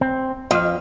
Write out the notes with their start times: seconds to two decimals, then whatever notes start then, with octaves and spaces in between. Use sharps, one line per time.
0.01 C4
0.51 F2 D#5 F5